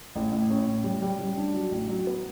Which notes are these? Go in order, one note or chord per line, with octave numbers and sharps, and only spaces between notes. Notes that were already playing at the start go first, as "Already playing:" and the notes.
A1
A2
C#4
A2
G3
G3
G3
D4
F#3
A1
F#3
B3